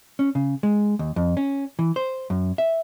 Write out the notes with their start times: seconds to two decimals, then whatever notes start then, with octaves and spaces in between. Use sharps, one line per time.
0.19 C#4
0.35 C#3
0.63 G#3
0.99 D#2
1.16 F2
1.37 C#4
1.79 E3
1.96 C5
2.30 F#2
2.58 E5